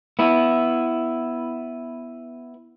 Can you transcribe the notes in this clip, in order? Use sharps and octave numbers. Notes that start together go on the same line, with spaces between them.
B3 E4